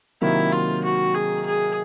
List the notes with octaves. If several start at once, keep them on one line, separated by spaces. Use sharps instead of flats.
C3 D#3 F#3 A#3 E4
F4
F#4
G#4
G#4